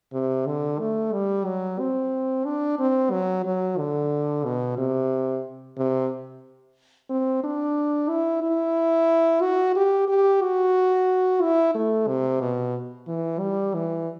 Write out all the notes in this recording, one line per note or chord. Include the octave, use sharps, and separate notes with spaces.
C3
D3
A3
G3
F#3
C4
D4
C4
F#3
F#3
D3
B2
C3
C3
C4
D4
E4
E4
F#4
G4
G4
F#4
E4
A3
C3
B2
E3
G3
E3